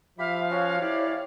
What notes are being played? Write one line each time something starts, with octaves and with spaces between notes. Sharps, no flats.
F3 G4 E5 F5 B5
C#4 F#4 C#5
E4 G4 D5